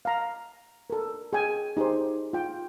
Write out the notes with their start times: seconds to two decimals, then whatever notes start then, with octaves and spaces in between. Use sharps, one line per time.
0.05 F5 A#5
0.90 A4 A#4
1.33 G#4 G5 G#5
1.77 D#4 G4 G#4 C5
2.33 F4 G5